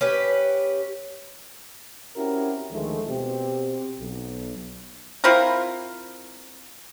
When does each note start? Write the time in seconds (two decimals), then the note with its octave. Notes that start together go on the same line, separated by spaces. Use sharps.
0.01 C#4 G4 B4
2.17 C4 C#4 E4 F#4 G4 A#4
2.71 D2 D#3 F3 G#3 A3
3.09 B2 C4 G4
3.99 B1
5.24 C4 E4 F4 A#4